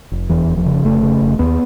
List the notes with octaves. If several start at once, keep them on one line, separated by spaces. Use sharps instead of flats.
F1
E2 E3
F1
F3
C#3
F1 A3
C#3
F1
D#2 B3